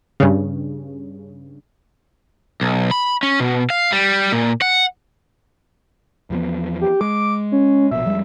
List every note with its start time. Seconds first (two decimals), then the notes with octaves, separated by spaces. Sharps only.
0.20 G2 C#3
2.61 B1
2.91 B5
3.23 C#4
3.40 B2
3.70 F5
3.92 G3
4.32 A#2
4.62 F#5
6.30 E2 F3 B3
6.81 G4
7.01 G#3 D6
7.52 C#4
7.91 A#1 B2 E5
8.06 F2 G3 G#3